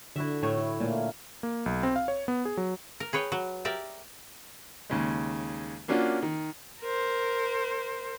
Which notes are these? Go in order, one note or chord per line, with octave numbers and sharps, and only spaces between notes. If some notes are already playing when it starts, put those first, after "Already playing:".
D3 E4 F#4 E5
A2 A3 C#5
E4
A#2 A3 A#3
A#3
B1
C4
F5
C#5
B3
G#4
F#3
A#4
G#4 B4 C#5 G5
F#3
G4 A#4 D5 E5 G5
D#2 C#3 G#3
A#3 C#4 D4 F4 F#4
D#3
A#4 C5